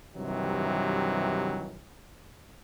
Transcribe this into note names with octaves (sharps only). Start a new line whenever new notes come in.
G2 C3 D#3 E3 F#3